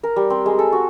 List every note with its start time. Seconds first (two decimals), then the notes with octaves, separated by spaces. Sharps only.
0.03 A#4
0.16 G3
0.30 C4
0.46 G#3
0.59 A4
0.72 F#4